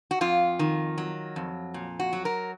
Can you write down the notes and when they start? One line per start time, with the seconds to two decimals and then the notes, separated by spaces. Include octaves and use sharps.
0.11 F#4
0.21 F2 F4
0.59 D#3
0.98 F#3
1.36 F2
1.74 A#2
1.99 F#4
2.13 F#3
2.25 A#4